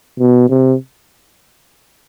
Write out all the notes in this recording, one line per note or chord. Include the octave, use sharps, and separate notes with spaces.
B2
C3